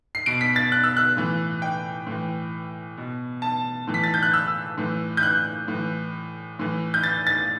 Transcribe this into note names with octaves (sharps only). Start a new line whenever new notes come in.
C7
B2 D7
B6
A6
F#6
E6
F#6
A2 E3
G5
A2 E3
B2
A5
A2 E3
B6
A6
G6
F#6
E6
A2 E3
G6
F#6
A2
E3
A2 E3
G6
A6
A6